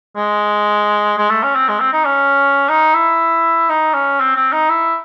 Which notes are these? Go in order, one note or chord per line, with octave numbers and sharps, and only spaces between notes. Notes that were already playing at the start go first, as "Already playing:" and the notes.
G#3
G#3
A3
C#4
C4
G#3
C4
D#4
C#4
D#4
E4
D#4
C#4
C4
C4
D#4
E4